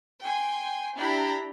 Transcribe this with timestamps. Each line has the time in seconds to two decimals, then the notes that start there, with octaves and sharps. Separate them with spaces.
0.22 G5 G#5 C6
0.96 D4 E4 G4 G5 A#5 B5